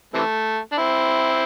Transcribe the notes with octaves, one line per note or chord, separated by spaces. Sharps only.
C3 E3 A3
D4
C4 E4